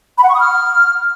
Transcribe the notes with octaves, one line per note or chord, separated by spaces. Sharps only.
B5
F#5
C#6
D#6
F6